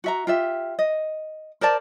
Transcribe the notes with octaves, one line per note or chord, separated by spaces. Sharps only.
F#4 E5 A#5
F4 G4 E5
D#5
A#4 C5 D5 A5